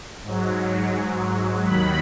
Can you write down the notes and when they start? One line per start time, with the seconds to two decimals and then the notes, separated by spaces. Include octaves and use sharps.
0.24 G#2 F#3
1.65 D#2 D#3 F#3 B5